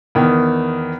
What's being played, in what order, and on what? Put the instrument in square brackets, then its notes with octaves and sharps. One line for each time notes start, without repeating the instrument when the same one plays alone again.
[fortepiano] E2 D#3